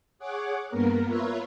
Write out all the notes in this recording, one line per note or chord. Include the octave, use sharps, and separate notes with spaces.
G#4 C#5 F#5 D6
G2 A#3 B3 A#4
F4 A#4 B4 C#5 E5